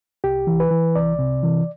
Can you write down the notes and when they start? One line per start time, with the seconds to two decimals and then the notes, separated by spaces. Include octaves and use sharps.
0.24 C2 G4
0.47 E3
0.60 B4
0.71 E3
0.96 C2 D5
1.19 C3
1.43 E3